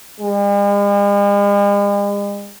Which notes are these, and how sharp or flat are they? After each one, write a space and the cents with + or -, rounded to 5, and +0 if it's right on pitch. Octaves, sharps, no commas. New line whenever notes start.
G#3 -45